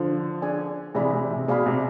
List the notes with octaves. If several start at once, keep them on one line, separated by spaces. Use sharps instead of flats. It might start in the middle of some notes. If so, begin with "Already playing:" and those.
Already playing: D3 F3
D4 G#4 D5 G#5
C3 E3 G#4 D5 F5 B5
C3
C3
B2 G#4 D5 F5 B5
C3